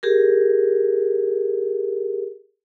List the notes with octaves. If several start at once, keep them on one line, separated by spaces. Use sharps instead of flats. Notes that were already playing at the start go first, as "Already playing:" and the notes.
G4 G#4 A#4